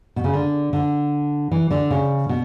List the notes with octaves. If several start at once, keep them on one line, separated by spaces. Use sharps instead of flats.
B2
C#3
D3
D3
E3
D3
C#3
B2